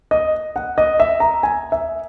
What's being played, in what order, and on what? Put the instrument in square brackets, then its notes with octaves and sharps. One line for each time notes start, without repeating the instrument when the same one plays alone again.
[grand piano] D#5
F#5
D#5
E5
A#5
G#5
E5